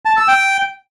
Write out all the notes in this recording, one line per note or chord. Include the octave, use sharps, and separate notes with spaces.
A5
E6
G5